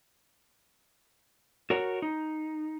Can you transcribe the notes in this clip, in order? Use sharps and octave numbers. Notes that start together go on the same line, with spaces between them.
F#4 A#4 C#5
D#4